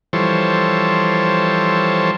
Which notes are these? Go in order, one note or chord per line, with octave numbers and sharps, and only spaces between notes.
E3 F3 G3 A4 C5 C#5